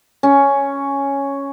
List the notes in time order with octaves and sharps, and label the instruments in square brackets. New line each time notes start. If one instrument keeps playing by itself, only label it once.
[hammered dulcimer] C#4